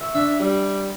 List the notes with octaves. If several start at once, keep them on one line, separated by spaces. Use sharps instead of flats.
E5 C#6
D4 E5
G3